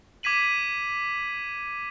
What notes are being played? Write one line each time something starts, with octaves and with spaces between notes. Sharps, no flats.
D6 G#6 B6 D#7 F#7